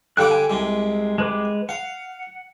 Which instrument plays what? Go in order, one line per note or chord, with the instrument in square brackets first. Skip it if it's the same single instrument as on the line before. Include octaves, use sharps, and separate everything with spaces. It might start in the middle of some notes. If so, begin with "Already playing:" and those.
[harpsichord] D3 G3 D6 [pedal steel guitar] F5 G5 F#6
[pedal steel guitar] G#5
[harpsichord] C2 C3 [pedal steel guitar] G#3
[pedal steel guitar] G#3 B4 D6
[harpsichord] F5 [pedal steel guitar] F#5